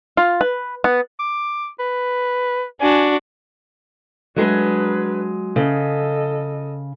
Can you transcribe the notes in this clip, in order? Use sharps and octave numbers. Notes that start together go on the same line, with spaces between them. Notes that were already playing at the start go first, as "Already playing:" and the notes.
F4
B4
B3
D6
B4
D4 F#4 G#5
F#3 G#3 D4 G#4 B4
C#3 A4 D#5